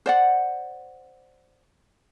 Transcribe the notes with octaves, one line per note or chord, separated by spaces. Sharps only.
C5 D5 F#5